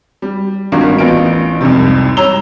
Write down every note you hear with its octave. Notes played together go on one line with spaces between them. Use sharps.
G3
G#1 G2 F4 F#4 A#4
A1 E3 B3 F4 D7
C2 F2 G#2 C3
G3 C#5 A#5 E6 F7 G7